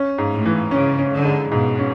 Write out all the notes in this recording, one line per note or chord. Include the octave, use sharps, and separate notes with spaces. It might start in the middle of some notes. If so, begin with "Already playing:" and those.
Already playing: C#4
G#2
A2
E3
C#3 C#4
C#4
D3
G#3
G#2 B2
C#4